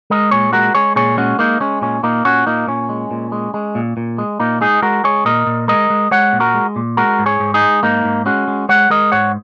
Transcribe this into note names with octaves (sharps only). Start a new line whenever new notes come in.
G#3 A#4 D#5
A#2 G#4 C#5
G#3 F#4 A#4
G#3 G#4 C#5
A#2 G#4 C#5
G#3 C#4 F#4
G#3 A#3 D#4
G#3 C#4
A#2 C#4
A#2 A#3 D#4
A#2 C#4 F#4
A#2 A#3 D#4
A#2 C#4
G#3
A#2
G#3
G#3
A#2
A#2
G#3
A#2 A#3 D#4
G#3 D#4 G#4
G#3 F#4 A#4
G#3 G#4 C#5
A#2 A#4 D#5
A#2
G#3 A#4 D#5
G#3
G#3 C#5 F#5
A#2
F#4 A#4
G#3
A#2
G#3 F#4 A#4
G#2
G#4 C#5
G#2
D#4 G#4
G#3
G#2 A#3 D#4
G#2
G#3 C#4 F#4
G#3
G#3 C#5 F#5
G#3 A#4 D#5
G#2 C#5 F#5